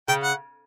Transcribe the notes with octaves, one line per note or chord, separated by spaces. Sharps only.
C#3 G5
F#5